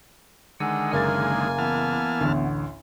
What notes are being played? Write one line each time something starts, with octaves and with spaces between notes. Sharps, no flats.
D3 D#3 G#3 F#5 G#5 E6
F#1 A#3 A#4 G#5 F6 A6
E3 B3 A5 F6
A1 D2